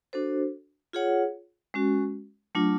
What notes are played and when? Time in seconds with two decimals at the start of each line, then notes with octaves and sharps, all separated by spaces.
0.13 D4 F#4 A4 C5
0.93 F4 G#4 C#5 F#5
1.74 G#3 C#4 F#4
2.55 F#3 A3 D4 F4